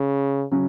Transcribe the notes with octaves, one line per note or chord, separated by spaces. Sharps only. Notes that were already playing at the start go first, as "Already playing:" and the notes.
Already playing: C#3
C#3 F#3 C#4